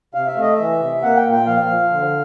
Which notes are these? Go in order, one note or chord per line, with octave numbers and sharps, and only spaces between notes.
C3 F5
E5
A3
D#5
E3 E5
C3
A#3 F#5
G5
A#2
G5
F3 F5
F3
D3